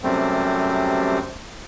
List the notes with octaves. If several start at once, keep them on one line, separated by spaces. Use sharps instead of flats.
F#2 C3 G3 A3 C4